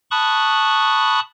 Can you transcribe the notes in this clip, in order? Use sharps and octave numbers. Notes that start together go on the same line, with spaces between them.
A5 B5 C#6 D#6 F#6